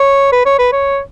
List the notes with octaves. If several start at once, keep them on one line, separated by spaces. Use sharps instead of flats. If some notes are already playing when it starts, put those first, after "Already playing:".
Already playing: C#5
B4
C#5
B4
C#5